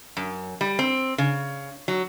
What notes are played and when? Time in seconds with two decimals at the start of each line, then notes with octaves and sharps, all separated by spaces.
0.17 F#2
0.61 G3
0.79 C4
1.18 C#3
1.88 F#3